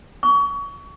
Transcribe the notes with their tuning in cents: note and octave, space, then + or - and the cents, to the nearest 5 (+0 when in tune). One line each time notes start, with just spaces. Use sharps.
C#6 +30